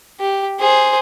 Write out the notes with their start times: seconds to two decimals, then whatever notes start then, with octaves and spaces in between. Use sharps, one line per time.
0.20 G4
0.59 G#4 C5